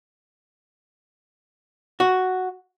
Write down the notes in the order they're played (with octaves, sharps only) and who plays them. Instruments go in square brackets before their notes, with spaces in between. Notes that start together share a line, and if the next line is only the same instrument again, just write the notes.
[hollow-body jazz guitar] F#4